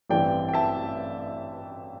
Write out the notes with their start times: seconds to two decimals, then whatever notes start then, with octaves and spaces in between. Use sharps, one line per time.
0.09 A1 G2 E3 C4 D5 G5
0.49 G5
0.53 E5 A5